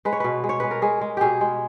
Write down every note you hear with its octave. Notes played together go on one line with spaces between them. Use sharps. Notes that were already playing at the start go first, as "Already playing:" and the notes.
G#3 B4
C#5
B2 B4
G#3
C#5
G#3 B4
A#4
G#3 G#4
G#3
B2 G4 G#4
G#3